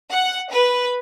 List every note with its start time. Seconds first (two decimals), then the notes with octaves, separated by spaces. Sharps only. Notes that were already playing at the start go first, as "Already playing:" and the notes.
0.11 F#5
0.51 B4